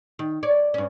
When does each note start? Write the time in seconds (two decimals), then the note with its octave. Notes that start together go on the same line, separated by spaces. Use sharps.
0.19 D#3
0.43 C#5 D5
0.74 G2 C#4